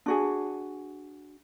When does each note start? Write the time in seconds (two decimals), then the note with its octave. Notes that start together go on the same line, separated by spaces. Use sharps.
0.06 D4 F#4 G#4